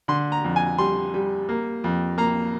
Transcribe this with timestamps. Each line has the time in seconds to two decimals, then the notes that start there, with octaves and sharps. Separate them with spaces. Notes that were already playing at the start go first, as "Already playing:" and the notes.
0.08 D3 C6
0.32 A#5
0.44 F2
0.56 G#5
0.78 G3 C6
1.14 G3
1.49 A#3
1.84 F2
2.18 A#3 A#5